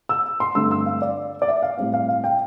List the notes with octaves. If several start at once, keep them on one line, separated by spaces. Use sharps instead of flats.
E6
C6
G2 D3 A3 C4 E6
E6
F5
D5
D5
E5
F5
A2 G3 C4 F5
F5
F5
G5